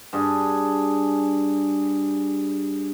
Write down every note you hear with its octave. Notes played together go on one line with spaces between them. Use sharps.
G2 G#4